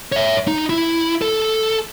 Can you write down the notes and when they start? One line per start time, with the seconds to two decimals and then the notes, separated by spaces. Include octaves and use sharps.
0.12 C#5 E5
0.48 D#4
0.70 E4
1.22 A4